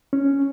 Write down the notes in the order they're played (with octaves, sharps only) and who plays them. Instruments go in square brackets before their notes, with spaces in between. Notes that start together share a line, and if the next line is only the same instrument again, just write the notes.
[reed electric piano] C#4